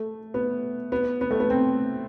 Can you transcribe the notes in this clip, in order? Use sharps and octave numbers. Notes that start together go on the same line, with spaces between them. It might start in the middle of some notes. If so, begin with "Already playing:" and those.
Already playing: A3
B3
B3
B3
A3
B3
C4